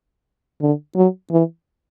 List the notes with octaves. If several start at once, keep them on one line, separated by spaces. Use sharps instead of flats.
D3
F#3
E3